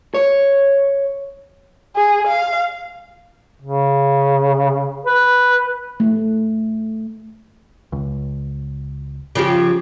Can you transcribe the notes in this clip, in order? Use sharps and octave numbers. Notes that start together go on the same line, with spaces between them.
C#5
G#4
F5
C#3
B4
A3
C#2
C#3 F3 G4